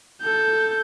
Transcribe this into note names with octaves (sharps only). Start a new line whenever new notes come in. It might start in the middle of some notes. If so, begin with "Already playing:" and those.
A4 G6